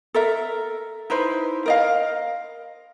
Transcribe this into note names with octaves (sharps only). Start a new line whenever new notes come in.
A4 A#4 E5
D#4 E4 B4 C5
A#4 D#5 F5